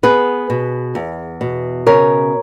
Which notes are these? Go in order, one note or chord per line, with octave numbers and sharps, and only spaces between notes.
B3 G#4 B4
B2
E2
B2
C#3 A#4 C#5